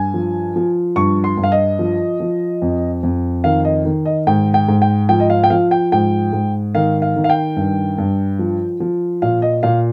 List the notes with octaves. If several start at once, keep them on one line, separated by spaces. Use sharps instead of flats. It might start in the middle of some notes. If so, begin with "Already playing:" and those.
Already playing: G2 G#5
F3
F3
G2 C#6
C6
G2
F5
D#5
F3
F3
F2
F2
D#3 F5
D#5
D#3
D#5
G#2 G5
G5
G#2
G5
F3 G5
D#5
F5
G5
F3 F5
G5
G#2 G5
G#2
D#3 F5
F5
D#3
F5
G5
G2
G2
F3
F3
A#2 F5
D#5
A#2 F5